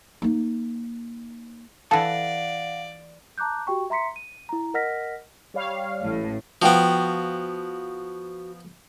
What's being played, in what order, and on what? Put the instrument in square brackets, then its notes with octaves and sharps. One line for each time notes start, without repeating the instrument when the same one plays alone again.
[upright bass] A#3 D#4
[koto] E3 A4 [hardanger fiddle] D5 [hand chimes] F5 F#5 A#6 [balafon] A5
[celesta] A5 A#5 D6 F#6 G6
F#4 G4 G5 C#6
E5 A#5 C6 B6 C#7
D#7
E4 A#5
A#4 D#5 F#5 F6 A#6 B6
[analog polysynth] G3 C#5 F5
[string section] A1 A2
[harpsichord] F3 B3 [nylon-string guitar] F#4 F#5 G5